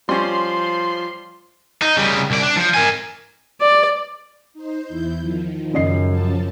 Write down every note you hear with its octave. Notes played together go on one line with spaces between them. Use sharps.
F3 G3 C#4 C6
D#4
C#3 G3
C2 D5
D4
F3
A#4 G#5
D5
D#4 C5
E2 E4 G6
D#3 F3
F#2 C#3 D#5 C7
F3 C#4 A5